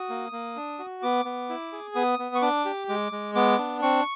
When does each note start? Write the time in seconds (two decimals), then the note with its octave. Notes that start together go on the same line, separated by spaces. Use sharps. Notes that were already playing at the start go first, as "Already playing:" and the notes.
Already playing: F#4 D#6
0.09 A#3
0.32 A#3
0.56 D4
0.79 F#4
1.03 B3 D6
1.25 B3
1.49 E4
1.72 G#4
1.95 B3 D#6
2.19 B3
2.35 C#6
2.42 D4 D6
2.65 G4
2.89 G#3 D6
3.12 G#3
3.35 B3 D6
3.58 D4
3.82 C4 C#6